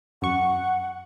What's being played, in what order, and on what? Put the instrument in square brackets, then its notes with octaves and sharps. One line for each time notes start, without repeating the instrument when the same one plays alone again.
[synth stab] F#2 C#6 [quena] F#5